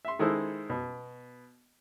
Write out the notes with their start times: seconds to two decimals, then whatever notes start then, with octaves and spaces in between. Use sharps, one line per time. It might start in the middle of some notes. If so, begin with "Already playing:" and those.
0.05 E5 C6
0.19 D#3 G#3 E4 A4 C5
0.70 B2